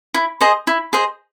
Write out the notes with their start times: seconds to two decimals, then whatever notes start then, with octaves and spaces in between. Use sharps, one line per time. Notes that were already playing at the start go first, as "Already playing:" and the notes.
0.14 E4
0.41 G#4 C5 D#5
0.67 E4
0.93 G#4 C5 D#5